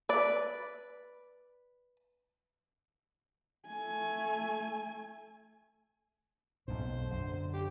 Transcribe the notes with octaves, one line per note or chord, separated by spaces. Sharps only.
B4 D5
A3 G#5
B1 F2 G#2 C5
F#2 D3
G4